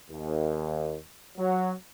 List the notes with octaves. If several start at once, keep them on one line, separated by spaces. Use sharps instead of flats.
D#2
F#3